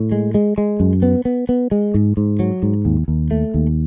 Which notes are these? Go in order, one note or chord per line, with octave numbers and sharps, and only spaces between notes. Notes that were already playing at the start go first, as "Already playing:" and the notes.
Already playing: A2
G#3
G#3
G#3
F#2
B3
B3
B3
G#3
G#2
G#2
F#3
G#2
D#2
D#2
A3
D#2